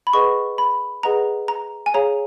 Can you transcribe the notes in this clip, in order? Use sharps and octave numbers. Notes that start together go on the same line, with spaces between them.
B5
G#4 B4 D#5 F#5 C#6
B5
G#4 B4 D#5 F#5 A#5
A#5
G#5
G#4 C#5 F5 A#5